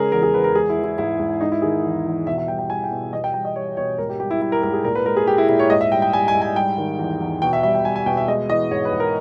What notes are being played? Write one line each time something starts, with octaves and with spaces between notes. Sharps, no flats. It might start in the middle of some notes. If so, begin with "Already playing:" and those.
Already playing: C#3 G#3 G#4 A#4
E2 A#4
G#4
E2 B4
A#4
G#3 G#4
E4
E3
E4
G#2 E4
G#2
G#3 D#4
E4
D#3 G#4
E2
E2
B2 E5
E5
G3 G5
G5
G3 G#5
G5
B2
B2 D#5
G5
G3 G5
D#5
G3 C#5
B2 C#5
G#2 A#4
G4
G3 G4
E4
G3 E4
A#4
G#2 A#4
G#4
A#2 A#4
B4
G#3 A#4
G#4
G#3 G4
E4
A#2 E4
C#5
G#2 D#5
E5
G3 G5
G5
G3 G#5
G#5
G#2
G#5
G3 G5
D#3
E2
E2
B2 G5
E5
G3 E5
G5
G3 G#5
G#5
B2 G5
E5
G#3 D#5
E3 D#5
G#2 C#5
B4
G#2
A#4